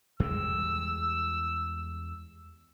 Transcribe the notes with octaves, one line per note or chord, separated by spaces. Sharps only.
E2 G3 G#3 E6